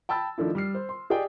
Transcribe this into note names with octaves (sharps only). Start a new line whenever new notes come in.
G5 A5 B5 E6 A6
D#3 F3 A3 D4 E4
G3 F6 C7
C5
C6
G4 G#4 D5 D#5 G5